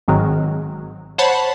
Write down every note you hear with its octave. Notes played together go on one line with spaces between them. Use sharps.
G#1 G#2 D#3 F#3
C5 C#5 F#5 A5 B5